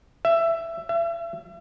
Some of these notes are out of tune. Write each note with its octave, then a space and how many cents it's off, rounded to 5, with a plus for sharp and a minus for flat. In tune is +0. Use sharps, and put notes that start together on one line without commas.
E5 +15
E5 +40